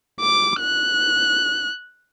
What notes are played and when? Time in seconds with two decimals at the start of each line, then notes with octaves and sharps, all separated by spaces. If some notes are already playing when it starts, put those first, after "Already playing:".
0.21 D6
0.61 F#6